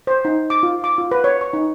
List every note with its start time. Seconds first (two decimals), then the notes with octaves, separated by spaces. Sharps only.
0.07 C5
0.25 D#4
0.50 D6
0.63 F4
0.84 D6
0.98 F4
1.11 B4
1.24 C#5
1.41 C#6
1.53 D#4